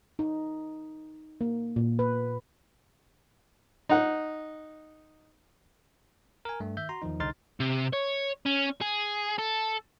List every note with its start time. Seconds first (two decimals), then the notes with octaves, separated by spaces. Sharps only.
0.19 D#4
1.41 A#3
1.76 A#2
1.99 B4
3.89 D#4 F#5
6.45 A#4 G#5
6.60 G2 A3
6.77 D#3 E5 G6
6.89 F#4 A#5 C6
7.02 E2 D#3 F3 D#4
7.20 C2 D3 D#4 C6 F6 A6
7.60 C3
7.93 C#5
8.46 C#4
8.82 G#4
9.38 A4